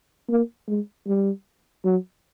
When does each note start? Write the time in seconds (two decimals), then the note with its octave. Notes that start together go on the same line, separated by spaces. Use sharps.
0.29 A#3
0.68 G#3
1.07 G3
1.84 F#3